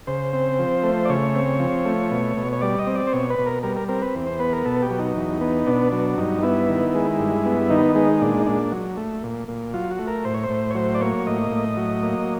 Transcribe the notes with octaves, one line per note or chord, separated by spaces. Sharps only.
C#3 C5
C4
F3
A3
D5
C#3 C#5
C4
F3
A3
B2
B2
C#5
G3 D5
D#5
C4
D5
C5
B2 C#5
B4
B2
A#4
G3 A#4
A#4
C4 A#4
B4
E2
C5
B3 B4
A#4
B2 A4
G4
F#3
D#4
E2
B3
B2 D4
F#3
G2 D#4
B3 E4
D#3
G#3
G2
B3
D#3 D#4
G#3 D#4
A#2 D4
D#4
A#2 D4
F#3
A3
A#2
A#2
F#3 F4
F#4
A3
A#4
A2 C5
C#5
C5
A2
C#5
F#3 C5
D5
A#3 C#5
A2 D#5
A2
F#3
A#3